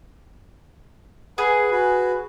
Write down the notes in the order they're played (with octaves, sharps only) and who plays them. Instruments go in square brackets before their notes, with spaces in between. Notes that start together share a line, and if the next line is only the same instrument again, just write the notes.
[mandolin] G#4 [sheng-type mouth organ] B4 F#5
[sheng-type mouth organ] F#4 B4